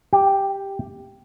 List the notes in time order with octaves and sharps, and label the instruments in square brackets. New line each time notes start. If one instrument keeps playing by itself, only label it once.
[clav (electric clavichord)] G4